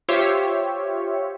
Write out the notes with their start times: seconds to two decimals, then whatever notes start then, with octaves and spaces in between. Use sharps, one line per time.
0.09 F4 G4 C5 C#5 E5